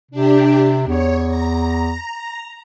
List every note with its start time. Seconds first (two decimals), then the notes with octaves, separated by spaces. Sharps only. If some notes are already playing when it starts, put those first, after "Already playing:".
0.11 C3 D4 G4
0.87 E2 C#5
1.28 A#5